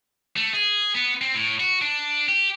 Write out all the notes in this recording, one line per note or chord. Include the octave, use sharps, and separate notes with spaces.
A3
G#4
B3
C4
A2
F#4
D4
G4